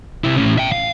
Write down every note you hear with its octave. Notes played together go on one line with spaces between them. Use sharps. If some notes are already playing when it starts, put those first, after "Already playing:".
C3 E4
A2 C#4
E5 G5
F5